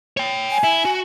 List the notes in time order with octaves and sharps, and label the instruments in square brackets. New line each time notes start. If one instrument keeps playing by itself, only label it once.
[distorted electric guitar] C#5 G5
[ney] G#5
[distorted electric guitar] E4
F#4